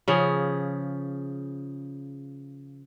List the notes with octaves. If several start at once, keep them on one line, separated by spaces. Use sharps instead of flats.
C#3 F3 G#4